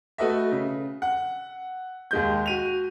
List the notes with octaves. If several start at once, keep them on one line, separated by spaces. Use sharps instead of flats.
A3 F#4 A4 B4 D#5 E5
C#3
F#5
D#2 G#3 G6
F#4 D#7 F7